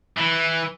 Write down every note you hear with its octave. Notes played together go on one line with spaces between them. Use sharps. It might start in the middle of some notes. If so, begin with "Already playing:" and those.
E3